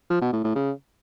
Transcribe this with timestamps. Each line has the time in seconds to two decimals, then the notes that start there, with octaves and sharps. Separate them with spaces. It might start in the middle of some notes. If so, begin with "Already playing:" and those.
0.10 F3
0.21 B2
0.33 A2
0.44 A2
0.55 C#3